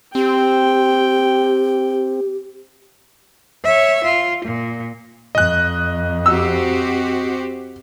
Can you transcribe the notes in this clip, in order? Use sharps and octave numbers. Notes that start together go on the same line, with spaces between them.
C4 G4 G5
C#5 E5
F4
A#2
F2 D#5 F#6
C4 F#4 G4 E6